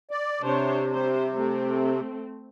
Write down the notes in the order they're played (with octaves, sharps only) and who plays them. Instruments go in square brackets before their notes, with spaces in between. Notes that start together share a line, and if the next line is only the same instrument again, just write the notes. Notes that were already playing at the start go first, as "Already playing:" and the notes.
[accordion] D5
[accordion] C3 [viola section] D4 C5 C#5
[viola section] G3 C5
A3 C4